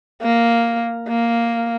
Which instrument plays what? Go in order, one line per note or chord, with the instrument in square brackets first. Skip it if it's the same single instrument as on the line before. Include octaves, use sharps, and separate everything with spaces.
[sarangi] A#3
A#3